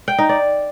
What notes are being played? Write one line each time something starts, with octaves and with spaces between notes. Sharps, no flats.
G5
D#4
D5